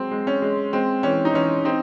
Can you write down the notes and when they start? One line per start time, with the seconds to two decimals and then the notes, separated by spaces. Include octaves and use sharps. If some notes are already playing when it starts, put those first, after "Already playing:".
Already playing: F#3 G#3 C4
0.11 G#3
0.27 C#4
0.42 G#3
0.73 G#3 C4
1.03 E3 C#4
1.25 D#4
1.34 E3 C#4
1.65 C4 D#4